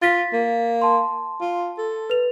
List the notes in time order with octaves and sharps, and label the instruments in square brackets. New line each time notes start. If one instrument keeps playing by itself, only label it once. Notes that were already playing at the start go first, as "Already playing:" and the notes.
[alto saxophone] F4 [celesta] A6 B6
[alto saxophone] A#3
[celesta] A5 C6
[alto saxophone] F4
A4
[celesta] B4 F7